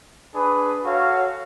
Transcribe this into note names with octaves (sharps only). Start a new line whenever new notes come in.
D4 G#4 B4
F#4 A4 C#5 F5